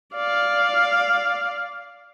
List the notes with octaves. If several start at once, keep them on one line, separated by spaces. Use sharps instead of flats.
D5 F5